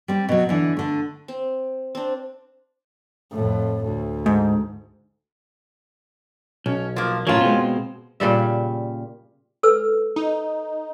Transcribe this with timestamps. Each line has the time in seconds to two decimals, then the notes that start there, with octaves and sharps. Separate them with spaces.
0.08 G3 C4
0.29 B2 F#3
0.49 D3 E3
0.77 D3 A3
1.28 C4
1.95 C4 D4
3.31 F2 A2
3.83 D2
4.26 G#2
6.66 B1 C#4
6.96 F3 A#3
7.27 A2 F3 F#3 C#4 F4 A#4
7.41 B2 G#3 C4
8.20 A#2 C#3 G3 E5
9.63 A4 B4 E6
10.16 D#4